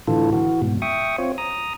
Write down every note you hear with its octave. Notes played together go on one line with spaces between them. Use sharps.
A2 D3 E3 F4 A4
E3 F#4
G#2 B2
E5 G5 C#6 D#6
C4 F4 C#5
A#5 D#6